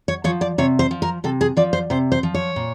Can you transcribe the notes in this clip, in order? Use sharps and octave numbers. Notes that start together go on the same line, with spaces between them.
C#5
F3 C#5
D5
C3 C#5
C5
F3
A#4
C3 A4
G#4
F3 D5
C5
C3 C5
C5
F3
C#5
A#2